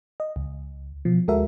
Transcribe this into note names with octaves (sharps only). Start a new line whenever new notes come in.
D#5
C#2
B2 F3
D2 G#3 F#4 A4 A#4 E5